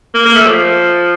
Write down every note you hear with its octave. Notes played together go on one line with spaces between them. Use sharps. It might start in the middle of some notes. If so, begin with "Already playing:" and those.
A#3
A#3
A3
F3